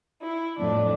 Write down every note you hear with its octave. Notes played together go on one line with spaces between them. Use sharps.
E4
F2 A2 D4